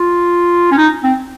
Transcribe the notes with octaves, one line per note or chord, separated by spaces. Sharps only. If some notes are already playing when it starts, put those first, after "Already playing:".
Already playing: F4
C#4
D#4
C4